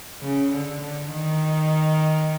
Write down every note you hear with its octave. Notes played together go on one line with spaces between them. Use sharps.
C#3
D3
D3
D#3